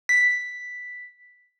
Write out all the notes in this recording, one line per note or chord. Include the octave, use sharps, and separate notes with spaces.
B6